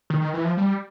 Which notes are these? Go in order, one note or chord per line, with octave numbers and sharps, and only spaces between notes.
D#3
D#3
E3
F3
G3